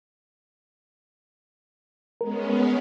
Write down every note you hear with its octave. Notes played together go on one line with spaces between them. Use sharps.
G#3 B3 C#4 A#4